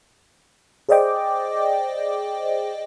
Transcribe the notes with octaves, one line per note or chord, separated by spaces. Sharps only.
G#4 C5 D5 D#5 G5 D6